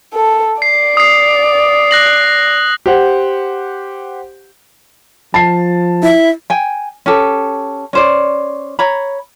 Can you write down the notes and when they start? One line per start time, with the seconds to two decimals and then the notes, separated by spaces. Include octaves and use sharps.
0.14 A4
0.62 D5 C7
0.97 D#6 C7
1.91 F#6 A#6 F#7
2.86 G4 C5 F#5
5.34 F3 A5 C7
6.03 E4 E5
6.50 G5 G#5
7.06 C#4 G4 A4
7.93 C#4 C5 D5
8.79 C#5 A#5 B5